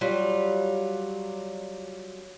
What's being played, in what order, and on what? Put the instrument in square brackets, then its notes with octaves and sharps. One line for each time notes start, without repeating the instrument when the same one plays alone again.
[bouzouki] F#3 G3 F4